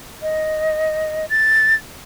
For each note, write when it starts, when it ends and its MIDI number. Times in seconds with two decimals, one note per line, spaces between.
0.22 1.26 75
1.30 1.75 93